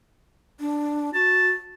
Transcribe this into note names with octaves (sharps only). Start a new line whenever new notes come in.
D4
F#4 A5